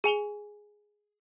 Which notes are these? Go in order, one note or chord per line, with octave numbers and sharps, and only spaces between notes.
G#4 G#5 F7 G7